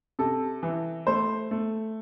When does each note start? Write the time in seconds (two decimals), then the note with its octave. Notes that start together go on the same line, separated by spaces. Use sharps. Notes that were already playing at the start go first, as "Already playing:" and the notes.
0.19 C3 A4
0.63 E3
1.07 A3 C5
1.51 A3